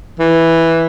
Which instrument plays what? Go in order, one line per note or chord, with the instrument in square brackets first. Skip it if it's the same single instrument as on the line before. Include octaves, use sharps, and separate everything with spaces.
[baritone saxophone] E3